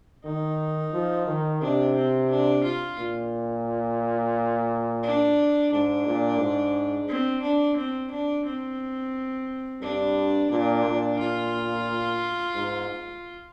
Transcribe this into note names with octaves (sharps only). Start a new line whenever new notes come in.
D#3 D#4
F3
D#3
C3 D4
C4
D4
F4
A#2
D4
G#2 D4
A#2
G#2
C4
D4
C4
D4
C4
G2 D4
A#2 D4
A#2
F4
G#2